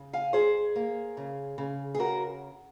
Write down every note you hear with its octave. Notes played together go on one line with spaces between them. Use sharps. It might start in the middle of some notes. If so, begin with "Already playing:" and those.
Already playing: C#3
F5 G#5
F2 G#4 C5
A#3
C#3
C#3
G#4
C#3 F#4 A#4